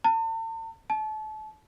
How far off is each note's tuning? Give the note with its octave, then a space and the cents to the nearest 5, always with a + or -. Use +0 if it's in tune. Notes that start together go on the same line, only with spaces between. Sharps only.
A5 +40
A5 -30